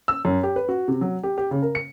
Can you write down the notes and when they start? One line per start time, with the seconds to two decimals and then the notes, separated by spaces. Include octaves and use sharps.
0.08 E6
0.25 F#2
0.43 G4
0.56 B4
0.69 F#4
0.88 C3
1.01 F#3
1.23 G4
1.38 G4
1.51 C#3
1.62 A#4
1.75 C#7